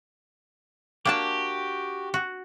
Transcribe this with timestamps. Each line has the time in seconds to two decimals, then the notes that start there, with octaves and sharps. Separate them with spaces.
1.06 A#3 D4 F#4 G4 A5
2.14 F#4